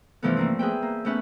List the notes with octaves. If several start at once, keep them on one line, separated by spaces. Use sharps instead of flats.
G2 C3 E3 F3 A3 B3
A3 A#3 C4
G#4 B4 E5 G5
A#3
A3 B3 C#4 B4 E5